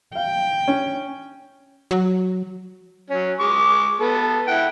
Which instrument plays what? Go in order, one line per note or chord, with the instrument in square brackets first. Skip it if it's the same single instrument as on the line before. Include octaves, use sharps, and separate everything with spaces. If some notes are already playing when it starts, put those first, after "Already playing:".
[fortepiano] F5 [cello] G5
[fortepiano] C#4
[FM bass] F#3
[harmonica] F#3 C#4
G#3 C#6 D6
B3 A4
E4 F#5 G5